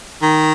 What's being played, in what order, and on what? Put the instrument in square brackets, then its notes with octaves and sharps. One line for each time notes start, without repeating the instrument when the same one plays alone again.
[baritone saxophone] D#3